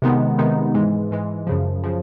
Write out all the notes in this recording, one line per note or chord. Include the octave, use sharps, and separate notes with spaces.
C3 D#3 G#3 B3 D#4
C3 D#3 G#3 B3 D#4
G#2 E3 G#3
G#2 E3 G#3
F#2 C#3 F3
C#3 F3